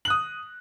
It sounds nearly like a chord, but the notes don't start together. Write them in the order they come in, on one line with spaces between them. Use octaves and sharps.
F#7 F#6 D#6